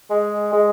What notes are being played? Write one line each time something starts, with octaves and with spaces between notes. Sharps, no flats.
G#3
G#3